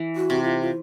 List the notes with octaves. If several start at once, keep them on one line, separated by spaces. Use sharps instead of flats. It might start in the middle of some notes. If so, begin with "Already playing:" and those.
Already playing: E3
F#4
C3
F4
F4